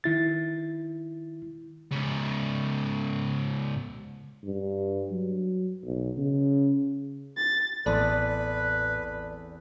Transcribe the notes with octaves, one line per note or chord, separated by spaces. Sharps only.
D#3 E4 A6
G#2 C#3
G2
F#3
B1
C#3
A6
A1 E2 B3 C4 A4 B4 D5 A5